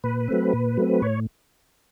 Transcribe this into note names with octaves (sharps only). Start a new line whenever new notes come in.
A#2 B4
F#3 A3 C4
A#2
F#3 A3 C4
A2 C#5